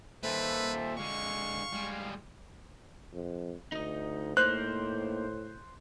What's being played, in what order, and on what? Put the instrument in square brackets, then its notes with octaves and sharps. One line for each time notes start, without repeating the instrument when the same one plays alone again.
[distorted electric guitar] D#2 A#2 [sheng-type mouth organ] A4 C5 E5 [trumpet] B4
[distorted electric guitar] D3 G#3 [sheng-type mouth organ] F5 [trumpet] C#6
[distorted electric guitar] G3 G#3
[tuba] F2
[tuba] D2 [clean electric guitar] D#4 D#5
[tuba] A2 [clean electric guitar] A#3 D#4 [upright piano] C5 [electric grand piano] F#6